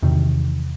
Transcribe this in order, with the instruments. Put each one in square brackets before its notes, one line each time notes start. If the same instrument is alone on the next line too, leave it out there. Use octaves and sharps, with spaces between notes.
[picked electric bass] E2 C3 D#3